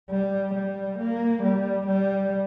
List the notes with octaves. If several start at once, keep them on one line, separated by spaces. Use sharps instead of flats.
G3
G3
A#3
G3
G3